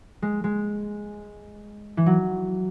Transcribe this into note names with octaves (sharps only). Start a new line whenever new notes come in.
G#3
G#3
E3
F#3